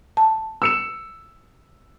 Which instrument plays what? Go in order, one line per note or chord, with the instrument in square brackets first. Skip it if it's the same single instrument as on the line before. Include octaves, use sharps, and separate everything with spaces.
[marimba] A5
[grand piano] E6 C#7 E7